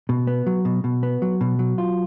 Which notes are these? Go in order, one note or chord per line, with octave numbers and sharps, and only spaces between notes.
B2
B3
F#3
B2
B2
B3
F#3
B2
F#3
F4